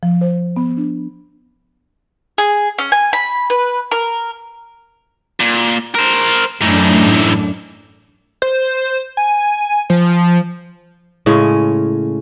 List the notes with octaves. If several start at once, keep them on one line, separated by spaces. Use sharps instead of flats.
F3
C5
B3
D4
G#4
C#4
G#5
B5
B4
A#4
A#2
A#4 C5
F#2 A2 E3 D4 D#4
C5
G#5
F3
A2 C#3 G#3 C#4